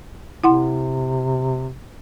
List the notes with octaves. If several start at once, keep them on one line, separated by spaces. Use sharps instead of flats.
C3 E4 F#5 C6